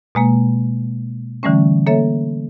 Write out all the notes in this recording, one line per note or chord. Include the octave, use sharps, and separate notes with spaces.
B2 G#3 A#3
D3 E3 G3 A3 C#4
A#3 A4 C#5 E5